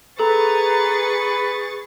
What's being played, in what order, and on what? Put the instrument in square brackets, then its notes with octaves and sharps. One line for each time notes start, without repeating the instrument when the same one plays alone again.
[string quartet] G#4 C#6 A6 [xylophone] A4 [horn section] B4 [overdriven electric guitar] A#5